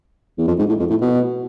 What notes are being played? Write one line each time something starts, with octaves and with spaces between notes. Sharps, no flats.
E2
F2
G#2
A2
F2
A2
B2